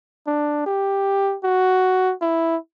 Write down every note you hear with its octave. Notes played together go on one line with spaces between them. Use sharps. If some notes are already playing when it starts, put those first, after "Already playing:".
D4
G4
F#4
E4